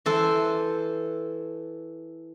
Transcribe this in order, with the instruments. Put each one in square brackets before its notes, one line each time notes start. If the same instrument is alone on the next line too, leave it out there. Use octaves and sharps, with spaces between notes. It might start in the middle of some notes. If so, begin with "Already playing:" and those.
[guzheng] E3 A4 C5